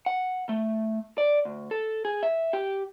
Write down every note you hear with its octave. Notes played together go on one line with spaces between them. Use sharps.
F#5
A3
D5
D2
A4
G#4
E5
G4